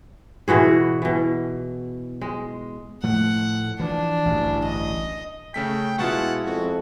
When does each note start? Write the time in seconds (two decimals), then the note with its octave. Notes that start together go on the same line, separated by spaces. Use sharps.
0.48 B2 E3 F#4 G#4
1.02 B2 E3
2.21 G#3
3.03 A2 F3 A3 F#5
3.80 E3 F3 D4
4.26 A1 D2 G2
4.64 D#5
5.54 C#3 A3 G5 B6
5.98 B2 G#3 E4 F4 F#5 A5 C#6
6.46 F2 F#4